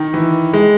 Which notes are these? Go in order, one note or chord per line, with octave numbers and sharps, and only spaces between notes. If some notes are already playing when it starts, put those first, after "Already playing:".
Already playing: D#3
E3
G#3